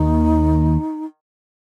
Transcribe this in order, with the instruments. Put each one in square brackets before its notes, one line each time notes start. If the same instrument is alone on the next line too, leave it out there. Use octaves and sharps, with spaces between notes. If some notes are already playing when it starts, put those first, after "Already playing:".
Already playing: [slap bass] D#2 D#3 A#3 [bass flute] D#4